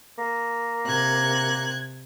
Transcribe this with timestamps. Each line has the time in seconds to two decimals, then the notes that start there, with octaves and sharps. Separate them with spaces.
0.18 A#3
0.86 C3 F#6 G#6